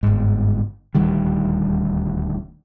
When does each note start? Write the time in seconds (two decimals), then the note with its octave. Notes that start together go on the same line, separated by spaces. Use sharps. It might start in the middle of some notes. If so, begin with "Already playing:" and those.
0.03 G1 G#2
0.95 D#1 D2 D#3 G3